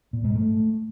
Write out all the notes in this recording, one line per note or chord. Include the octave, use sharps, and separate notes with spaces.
A#2
G#2
A3